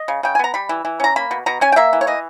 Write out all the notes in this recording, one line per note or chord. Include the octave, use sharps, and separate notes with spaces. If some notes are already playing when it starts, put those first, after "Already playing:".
Already playing: D#5
C#3
C#3 G5
G#5
B3 A#5
G3 B5
E3
E3
C#4 A#5
A#3 B5
B2
B2 A#5
C#4 G#5
G5
A#3 E5
E3
C#5
E3 D#5